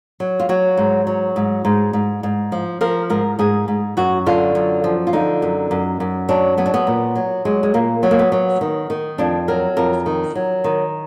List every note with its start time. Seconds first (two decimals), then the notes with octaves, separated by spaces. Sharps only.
0.20 F#3
0.40 F4
0.49 F#3 F#4
0.77 G#2
1.07 F#3
1.36 G#2
1.65 G#2
1.93 G#2
2.23 G#2
2.52 F3
2.81 F3 A#4
3.10 G#2 A#4
3.39 G#2 G#4
3.68 G#2
3.97 F#2 F#4
4.26 D3 F4
4.55 F#2
4.84 F3
5.07 F4
5.13 D3 D#4
5.42 F#2
5.71 F#2
6.00 F#2
6.29 F#3 D4
6.58 F#3 B3
6.66 D4
6.74 B3
6.87 A#2
7.15 F#3
7.45 F#3 G#3
7.63 G#3
7.74 A#2 A#3
8.03 F#3 B3
8.11 A#3
8.19 B3
8.32 F#3
8.61 D#3
8.90 D#3
9.18 F2 D4
9.48 F#3 A#4
9.77 F2 A#4
10.06 D#3
10.35 F#3
10.64 D#3